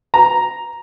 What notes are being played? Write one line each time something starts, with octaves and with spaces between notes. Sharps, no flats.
A#5